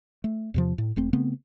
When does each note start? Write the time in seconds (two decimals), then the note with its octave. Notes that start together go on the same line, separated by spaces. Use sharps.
0.24 A3
0.54 E2 C3 F3
0.78 A2
0.96 E1 A3 C4
1.13 C#3 A3 B3 C4